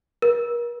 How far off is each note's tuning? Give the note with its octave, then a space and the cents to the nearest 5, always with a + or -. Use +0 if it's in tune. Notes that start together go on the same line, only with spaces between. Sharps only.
A#4 +40